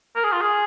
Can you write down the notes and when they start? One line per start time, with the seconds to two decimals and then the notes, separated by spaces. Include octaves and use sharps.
0.16 A#4
0.24 G#4
0.32 F4
0.41 G#4